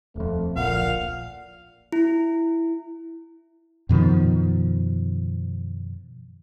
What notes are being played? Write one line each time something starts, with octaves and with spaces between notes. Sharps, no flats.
D#1 F2 A3
D1 A#1 A#2 F5 F#5
E4
F#2 B2 D#3 F3